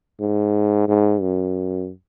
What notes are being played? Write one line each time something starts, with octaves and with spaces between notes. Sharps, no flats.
G#2
G#2
F#2